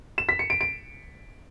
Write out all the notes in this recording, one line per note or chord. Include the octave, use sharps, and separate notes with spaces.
E7
B6
C#7
D7
D7